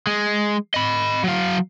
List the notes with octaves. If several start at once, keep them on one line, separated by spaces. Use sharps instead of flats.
G#3
D#5 B5
F#3 F5